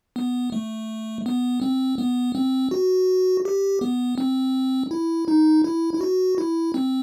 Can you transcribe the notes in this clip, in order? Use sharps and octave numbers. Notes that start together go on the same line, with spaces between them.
B3
A3
B3
C4
B3
C4
F#4
G4
B3
C4
E4
D#4
E4
E4
F#4
E4
C4